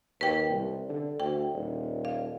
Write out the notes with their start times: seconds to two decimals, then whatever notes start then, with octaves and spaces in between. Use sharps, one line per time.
0.21 D#2 B4 G5
0.50 C2
0.89 D3
1.20 D2 G5
1.53 D#1
2.05 F5